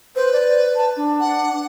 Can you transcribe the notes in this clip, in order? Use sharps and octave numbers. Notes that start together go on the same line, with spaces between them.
B4 C5
D5
A5
D4
F#5